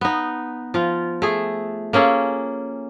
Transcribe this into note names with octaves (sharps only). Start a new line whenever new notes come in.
B3 D#4
F3 F4
A3 G#4
A#3 C#4 G#4 A4